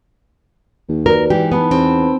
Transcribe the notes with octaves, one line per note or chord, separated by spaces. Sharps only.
D#2
F#4 A#4 B4 D5
G#2 E3 G4
B3 D#4 A5 B5
E2 C4